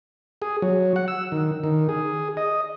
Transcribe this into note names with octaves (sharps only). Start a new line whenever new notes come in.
G#4
F#3
F#5
E6
D#3
D#3
G#4
D#5